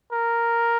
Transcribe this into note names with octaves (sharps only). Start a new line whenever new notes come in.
A#4